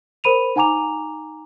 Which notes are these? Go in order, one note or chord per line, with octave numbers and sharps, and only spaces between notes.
A#4 C5 B5 D#7 F7
D#4 F#5 G#5 A#5 D6 F7